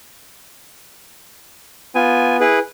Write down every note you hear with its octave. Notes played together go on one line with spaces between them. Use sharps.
B3 F4 G#5
E4 G#4 B4